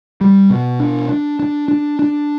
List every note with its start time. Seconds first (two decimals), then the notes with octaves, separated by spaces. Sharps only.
0.21 G3
0.50 B2
0.80 D4
1.09 D4
1.39 D4
1.68 D4
1.99 D4